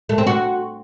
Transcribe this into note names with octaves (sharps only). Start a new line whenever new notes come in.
A3
C4
F#4